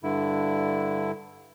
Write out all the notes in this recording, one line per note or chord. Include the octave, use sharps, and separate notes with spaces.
G2 D3 E4